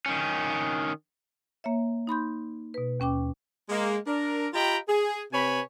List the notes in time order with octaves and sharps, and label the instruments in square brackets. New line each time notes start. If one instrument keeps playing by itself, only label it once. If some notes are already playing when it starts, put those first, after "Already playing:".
[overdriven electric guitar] D#3 C#4
[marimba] A#3 C#5 E5
D#4 B5 C6 G6
B2 B4
D#2 C#4 G5 D6
[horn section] G#3 A#3
D4 A#4
F4 G4 D#5 G5 A#5 B5
G#4
C3 B4 C#5 G#5 B5